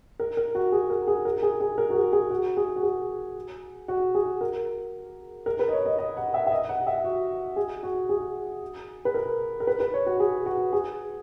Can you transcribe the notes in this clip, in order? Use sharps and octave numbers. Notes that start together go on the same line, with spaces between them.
A#4
A#4
F#4
G#4
A#4
G#4
A#4
G#4
G#4
A#4
F#4
G#4
G#4
F#4
G#4
F#4
G#4
F#4
G#4
A#4
A#4
B4
D#5
C#5
D#5
D#5
F#5
E5
E5
D#5
F#5
E5
F#4
G#4
F#4
G#4
B4
A#4
A#4
B4
B4
C#5
F#4
G#4
F#4
G#4